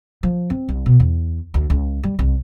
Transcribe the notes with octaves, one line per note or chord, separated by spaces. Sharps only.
F3
C4
C2
B2
E2
D2
C#2
G3
C2